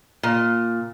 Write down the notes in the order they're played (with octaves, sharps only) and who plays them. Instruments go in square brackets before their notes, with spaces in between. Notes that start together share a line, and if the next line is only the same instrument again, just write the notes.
[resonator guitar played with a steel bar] A#2